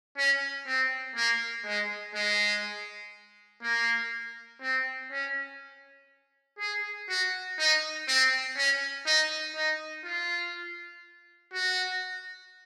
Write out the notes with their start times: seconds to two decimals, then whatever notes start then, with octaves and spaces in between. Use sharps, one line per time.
0.17 C#4
0.66 C4
1.15 A#3
1.65 G#3
2.15 G#3
3.62 A#3
4.61 C4
5.11 C#4
6.59 G#4
7.09 F#4
7.58 D#4
8.08 C4
8.57 C#4
9.06 D#4
9.55 D#4
10.04 F4
11.53 F#4